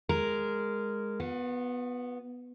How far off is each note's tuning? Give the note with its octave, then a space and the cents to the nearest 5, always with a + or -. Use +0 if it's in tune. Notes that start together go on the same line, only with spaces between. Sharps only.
G#3 -5 A#4 -5
B3 +0 F4 +45